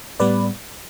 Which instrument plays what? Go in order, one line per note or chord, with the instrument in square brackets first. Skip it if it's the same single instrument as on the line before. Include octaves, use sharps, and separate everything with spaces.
[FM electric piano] A2 G3 B3 B4 D5